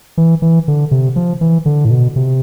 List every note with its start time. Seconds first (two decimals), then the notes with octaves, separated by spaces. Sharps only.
0.17 E3
0.42 E3
0.68 D3
0.91 C3
1.16 F3
1.41 E3
1.66 D3
1.85 A2
1.91 B2
2.16 C3